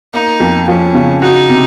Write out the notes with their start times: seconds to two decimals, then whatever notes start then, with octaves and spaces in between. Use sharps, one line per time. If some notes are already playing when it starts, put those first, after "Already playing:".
0.14 A#3 D#4
0.40 F2
0.68 F3 C#4
0.95 C#3
1.22 D#4 F#4
1.50 C3